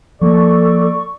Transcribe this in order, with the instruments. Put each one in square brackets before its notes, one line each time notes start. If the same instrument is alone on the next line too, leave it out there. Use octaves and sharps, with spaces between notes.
[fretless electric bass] F3 A#3 [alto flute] A4 [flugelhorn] D5 [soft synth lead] C#6